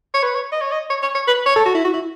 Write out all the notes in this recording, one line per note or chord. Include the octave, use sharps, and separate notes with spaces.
C#5
B4
C#5
D#5
C#5
D#5
C#5
C#5
C#5
B4
C#5
A4
F#4
E4
F#4
E4